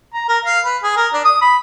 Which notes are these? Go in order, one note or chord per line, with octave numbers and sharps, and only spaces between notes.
A#5
A#4
F5
B4
G#4
A#4
D4
D#6
B5